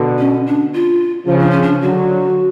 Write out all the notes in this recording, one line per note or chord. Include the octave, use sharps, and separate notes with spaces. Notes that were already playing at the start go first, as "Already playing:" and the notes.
Already playing: B2 D3
C#4
D4
F4
C#3 F3 F4
D4
C#4
D4
D3 F#3 F#4